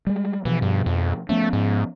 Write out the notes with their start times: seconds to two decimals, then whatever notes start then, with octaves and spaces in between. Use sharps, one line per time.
0.07 G3 G#3
0.45 B2 E3 F3
0.62 G2
0.86 F2
1.29 F3 A3 B3 C#4
1.53 G#2